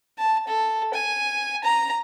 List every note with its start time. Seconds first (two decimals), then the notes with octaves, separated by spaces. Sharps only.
0.19 A5
0.47 A4
0.94 G#5
1.64 A#5